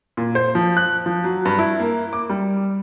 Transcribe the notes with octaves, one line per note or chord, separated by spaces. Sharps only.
A#2
C5
F3
F#6
F3
F#3
G2
E4
A#3
D6
G3